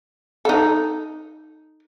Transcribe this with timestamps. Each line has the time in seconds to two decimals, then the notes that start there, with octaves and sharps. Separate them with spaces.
0.45 D#4 A4